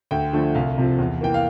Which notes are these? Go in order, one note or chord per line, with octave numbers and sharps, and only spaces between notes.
D2 G5
D3 F3 A3
C2 F5
C3 F3
E2
E3 A#3 G5
F5